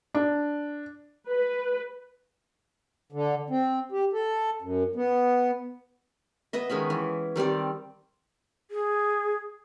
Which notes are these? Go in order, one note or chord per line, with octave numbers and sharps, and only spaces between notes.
D4
B4
D3
C4
G4
A4
F#2
B3
B3 B4 D#5 E5
D#3 G#3 C#4 B5
E3
D#3 G3 C4 D5
G#4